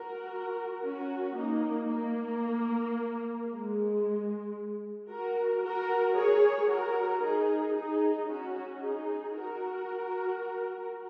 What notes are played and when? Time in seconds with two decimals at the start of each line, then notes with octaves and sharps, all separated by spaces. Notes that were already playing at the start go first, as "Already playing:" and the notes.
Already playing: F#4 A#4
0.83 C#4 F#4
1.37 A#3 D#4
1.90 A#3
3.50 G#3
5.10 F#4 A#4
5.63 F#4 A#4
6.16 G#4 C#5
6.70 F#4 A#4
7.23 D#4 G#4
7.76 D#4 G#4
8.29 C#4 F#4
8.82 D#4 G#4
9.36 F#4 A#4